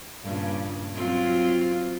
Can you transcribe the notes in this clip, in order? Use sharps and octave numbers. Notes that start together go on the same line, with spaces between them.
G2 A#2 C#3
F#3 C4 F4